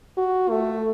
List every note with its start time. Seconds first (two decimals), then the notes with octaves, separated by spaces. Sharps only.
0.17 F#4
0.50 A3